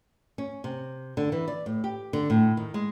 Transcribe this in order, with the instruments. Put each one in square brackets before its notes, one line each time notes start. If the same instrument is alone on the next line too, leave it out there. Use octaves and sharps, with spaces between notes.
[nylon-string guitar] C#4
C3
D3
E3
D5
A2
G4
D3
A2
D#3
G#3